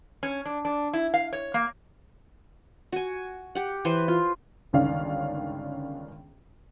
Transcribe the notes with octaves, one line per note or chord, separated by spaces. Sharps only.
C#4
D4
D4
E4
F5
C#5
A#3
F#4 G#5
G4 F#5
E3 B4 C5 C6
F4
G1 C#2 D#3 C#4 D4 F5